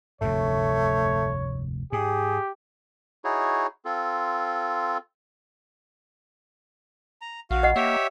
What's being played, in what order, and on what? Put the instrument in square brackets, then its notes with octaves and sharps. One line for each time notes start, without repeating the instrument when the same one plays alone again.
[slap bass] F1 D2 G2 [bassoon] A3 [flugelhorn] C#5
[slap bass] G#2 [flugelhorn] G4 [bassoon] G#4
[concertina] D#4 E4 F#4 G#4 C#5
C4 F4 A4
[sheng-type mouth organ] A#5
[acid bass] A#1 [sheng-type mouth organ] F#4 F5
[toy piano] D#5 F#5
[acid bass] A#3 [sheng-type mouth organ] G4 C#5 E5